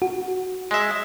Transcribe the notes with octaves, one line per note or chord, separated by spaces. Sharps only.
F#4
G#3 E5